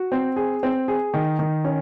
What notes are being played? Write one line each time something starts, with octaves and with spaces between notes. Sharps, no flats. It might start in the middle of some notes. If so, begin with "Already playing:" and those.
Already playing: F#4
C4
G#4
C4
G#4
D#3
D#3
C#4